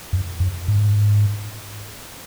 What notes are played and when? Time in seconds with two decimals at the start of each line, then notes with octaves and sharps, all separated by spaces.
0.13 F#2
0.40 F#2
0.68 G#2